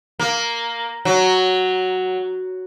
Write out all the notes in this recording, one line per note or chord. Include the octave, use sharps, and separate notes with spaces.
A#3
F#3